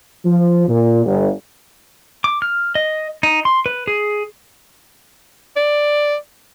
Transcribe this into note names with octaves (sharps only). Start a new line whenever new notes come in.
F3
A#2
G1
D6
F6
D#5
D#4
C6
B4
G#4
D5